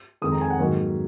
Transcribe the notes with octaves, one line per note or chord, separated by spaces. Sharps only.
F2 D#3 G#3 D#6
A#5
G#5
F#5
G#2 D#3 F#3 A#3 C#5